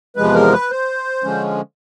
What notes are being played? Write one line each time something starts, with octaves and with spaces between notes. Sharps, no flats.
E2 C3 F3 G#3 B4
A#4
B4
C5
D3 F3 G#3 C#4